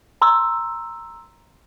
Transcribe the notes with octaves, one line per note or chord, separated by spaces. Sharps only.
A#5 C6 E6